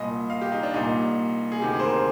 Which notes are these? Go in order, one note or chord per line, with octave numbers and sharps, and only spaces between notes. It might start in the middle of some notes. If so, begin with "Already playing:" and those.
Already playing: C2 A#2 D#5
F5
G4
D#4
D4
C2 A#2 D#4
G#4
D2 C3 D#3 G4
G#4
C5
A#4
C5